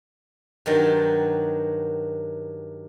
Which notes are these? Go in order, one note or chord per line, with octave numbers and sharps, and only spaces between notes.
G2 D#3 F#3 A5